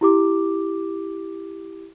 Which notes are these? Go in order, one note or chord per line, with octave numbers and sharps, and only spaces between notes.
E4 G4 D6